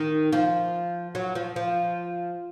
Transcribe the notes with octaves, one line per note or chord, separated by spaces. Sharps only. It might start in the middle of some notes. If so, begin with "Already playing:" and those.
Already playing: D#3
F3
F#3
F3
F3